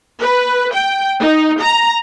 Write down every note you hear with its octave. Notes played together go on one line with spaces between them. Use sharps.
B4
G5
D#4
A#5